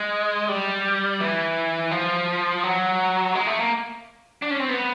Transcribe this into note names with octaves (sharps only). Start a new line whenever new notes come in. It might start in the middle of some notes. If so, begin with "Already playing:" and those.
Already playing: G#3
G3
E3
F3
F#3
G#3
A3
A#3
D4
C#4
C4
B3